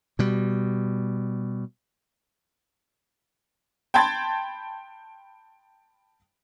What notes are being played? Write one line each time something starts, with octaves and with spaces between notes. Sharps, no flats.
B2 G3
G5 A5 B5 C6 G#6 A6